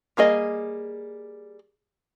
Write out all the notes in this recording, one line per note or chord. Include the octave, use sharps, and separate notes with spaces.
G3 A#3 G#4 D#5